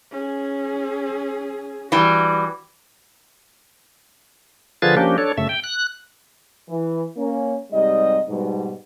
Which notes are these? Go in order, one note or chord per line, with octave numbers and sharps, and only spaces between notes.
C#4 G#4
E3 G3 F#4
D3 F3 F4 G#4 B4 A6
F3 A#3 C#4 D4 G4
D4 A4 C#5
F#2 C#3 A3 E5
G5
F#6
E3
A#3 C#4
G#2 C3 G3 D#5
G#2 B2 G3